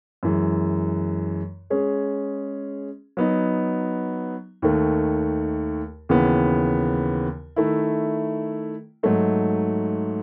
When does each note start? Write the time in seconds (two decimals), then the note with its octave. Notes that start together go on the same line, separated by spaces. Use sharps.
0.23 F#2 E3 G#3
1.70 G#3 C#4 G#4
3.17 F#3 B3 D#4
4.62 D#2 D#3 A3
6.09 D#2 C#3 E3 B3
7.56 D#3 A3 E4
9.03 G#2 F#3 A3 D#4